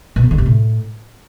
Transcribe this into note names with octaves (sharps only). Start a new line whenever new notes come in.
B2
F2
D3
C3
A2